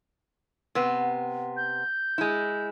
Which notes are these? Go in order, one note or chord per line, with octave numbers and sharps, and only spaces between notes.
C3 B3
G6
G#3 E4